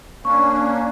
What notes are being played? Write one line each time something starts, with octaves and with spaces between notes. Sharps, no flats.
A#3 C#4 D4 C#6